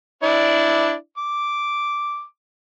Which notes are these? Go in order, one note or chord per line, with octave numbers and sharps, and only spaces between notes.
D4 E4 D5
D6